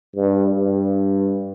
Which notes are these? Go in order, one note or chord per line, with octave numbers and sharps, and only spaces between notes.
G2
G2